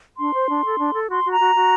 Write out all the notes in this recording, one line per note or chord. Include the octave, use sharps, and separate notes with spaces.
D4 C6
C5
D4
A4
D4
A4
F#4 C6
F#4
A#5
F#4
F#4